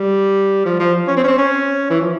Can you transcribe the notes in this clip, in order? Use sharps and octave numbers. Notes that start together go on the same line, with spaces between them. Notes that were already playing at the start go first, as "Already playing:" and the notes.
Already playing: G3
F3
F3
C#4
C4
C#4
C4
C#4
E3
F3